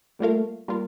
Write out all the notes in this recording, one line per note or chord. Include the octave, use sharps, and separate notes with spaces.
G3 A3 A#3 F4 A#4 F5
G3 A#3 F4 A#4